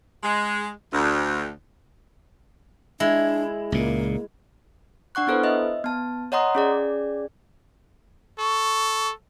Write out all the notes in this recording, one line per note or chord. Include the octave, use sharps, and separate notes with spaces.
G#3
D2
G#3 D4 E4 E5
C#2 A#2 A#3
D4 F#5 C#6 F#6
B3 E4 A4 B4 C5
D#5 E5
B3 A5
C#5 D#5 F#5 A#5 C6 D#6
C#4 G#4 D5
A4 C#6